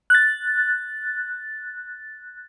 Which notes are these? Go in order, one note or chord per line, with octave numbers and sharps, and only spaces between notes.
F#6 A6